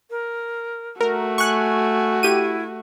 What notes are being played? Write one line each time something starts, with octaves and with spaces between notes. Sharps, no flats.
A#4
A3 F#4 A#4
G#5 C#6 F#6
E4 G4 D#7